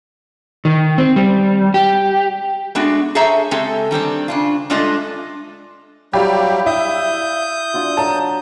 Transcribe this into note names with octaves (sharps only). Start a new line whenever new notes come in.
D#3
C4
G3
G4
G#3 A3 B3 D4 F#4
G#4 A4 C5 C#5 E5 A#5
C#3 G#3 C4 G4 A4
D#3 G3 C4 D4
C#3 D4 F4
G2 G#3 A3 D4 F4 D#5
F#3 G3 E4 G4 D5 F5 G5
E4 D#6 G6
D4 F4 F#4
F#3 A#4 A5